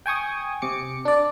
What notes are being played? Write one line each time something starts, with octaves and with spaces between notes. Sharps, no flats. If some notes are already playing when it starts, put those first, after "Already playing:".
G5 G#5 C#6 D#6
C3 D6 C#7
D4 D5